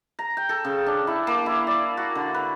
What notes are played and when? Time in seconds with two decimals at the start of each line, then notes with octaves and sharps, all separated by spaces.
0.19 A#5
0.37 G5
0.49 A4
0.65 C#3
0.86 D4
1.07 E4
1.27 A#3
1.46 E4
1.67 D5
1.97 F#4
2.15 D3
2.34 B4